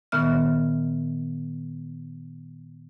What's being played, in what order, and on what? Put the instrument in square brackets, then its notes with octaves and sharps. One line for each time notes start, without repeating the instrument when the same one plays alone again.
[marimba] A#2 D#3 B3 E5 F6